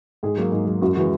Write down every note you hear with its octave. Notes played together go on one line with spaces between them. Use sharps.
G#2 G#4
F#3 A#3
G#2
F#3 A#3
F#2 F#4
C#3 E3 G#3 F#4